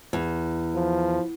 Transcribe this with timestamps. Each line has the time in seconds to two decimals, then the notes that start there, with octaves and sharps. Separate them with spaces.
0.13 E2
0.75 F3